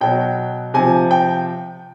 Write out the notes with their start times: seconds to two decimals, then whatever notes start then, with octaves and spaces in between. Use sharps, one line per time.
0.01 B2 F#3 G5
0.74 C3 F3 G#5
1.11 G5